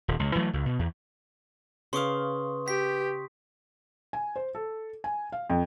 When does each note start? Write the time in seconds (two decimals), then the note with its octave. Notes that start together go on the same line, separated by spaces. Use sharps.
0.08 D#1
0.19 C#2
0.35 E3 F#3 G#3 A3
0.53 C#2
0.66 B2
0.79 E2
1.93 C#3 B4 F5 C6 C#6 D#6
2.68 G4 B6
4.13 G#5
4.36 C5
4.55 A4
5.04 G#5
5.32 F5
5.50 F2